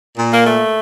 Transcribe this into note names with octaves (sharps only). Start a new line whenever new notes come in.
A#2
A#3
A3